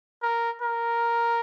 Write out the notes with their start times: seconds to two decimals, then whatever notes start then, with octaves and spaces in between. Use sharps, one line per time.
0.22 A#4
0.62 A#4